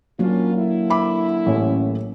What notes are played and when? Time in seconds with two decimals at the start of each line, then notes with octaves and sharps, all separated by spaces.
0.19 F#3 A#3 C#4 D4 F4
0.56 D3 E4
0.90 E5 B5 D6
1.46 A1 A2 C#4